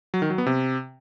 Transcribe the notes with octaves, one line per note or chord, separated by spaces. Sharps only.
F#3
D#3
F#3
B3
C3